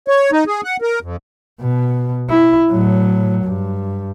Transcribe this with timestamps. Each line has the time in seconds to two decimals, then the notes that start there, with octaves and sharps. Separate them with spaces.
0.08 C#5
0.32 D#4
0.47 G#4
0.64 F#5
0.82 A#4
1.02 F2
1.61 B2
2.30 E4
2.71 A2 F#3
3.44 G2